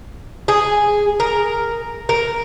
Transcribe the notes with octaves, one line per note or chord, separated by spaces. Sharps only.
G#4
A#4
A#4